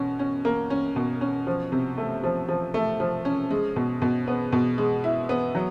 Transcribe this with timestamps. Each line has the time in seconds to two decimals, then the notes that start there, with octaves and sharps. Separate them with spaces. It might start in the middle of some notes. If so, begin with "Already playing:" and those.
Already playing: B2 C#4
0.19 C#4
0.45 A#3
0.70 C#4
0.96 B2
1.21 C#4
1.47 F3
1.72 C3
1.98 A3
2.24 F3
2.49 F3
2.74 A3
3.00 F3
3.25 C#4
3.51 G#3
3.76 B2
4.02 B2
4.28 B3
4.52 B2
4.78 G#3
5.04 E4
5.29 B3
5.55 F#3